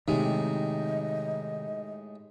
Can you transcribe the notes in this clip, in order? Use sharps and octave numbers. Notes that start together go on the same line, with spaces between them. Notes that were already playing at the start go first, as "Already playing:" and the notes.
A2 C3 D#3 G#3 D#4 G4 D#5